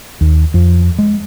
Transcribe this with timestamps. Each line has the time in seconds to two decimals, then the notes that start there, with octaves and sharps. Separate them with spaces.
0.21 D#2
0.54 F2
0.99 G#3